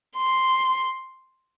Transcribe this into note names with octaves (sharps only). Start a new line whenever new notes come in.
C6